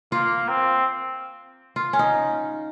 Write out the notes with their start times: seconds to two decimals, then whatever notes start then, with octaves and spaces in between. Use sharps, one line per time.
0.12 A#3 F4
0.48 C4
1.76 F4
1.93 C#4
1.99 D#4